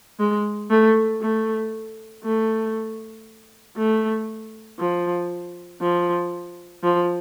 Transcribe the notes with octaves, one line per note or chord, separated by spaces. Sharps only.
G#3
A3
A3
A3
A3
F3
F3
F3